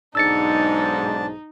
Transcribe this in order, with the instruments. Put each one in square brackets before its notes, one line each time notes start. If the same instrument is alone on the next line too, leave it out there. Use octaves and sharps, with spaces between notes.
[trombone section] B1 G#2 [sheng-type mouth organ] D4 A5 [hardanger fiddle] D#4 [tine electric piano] E6 A6 C#7